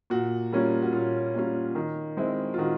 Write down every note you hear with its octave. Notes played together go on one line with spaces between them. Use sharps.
A#2 F#4
G3 A#3 C#4 F4
F#4
A#2 F4
G3 A#3 C#4 F4
D#3
G#3 C4 E4
F4
D#3 F#4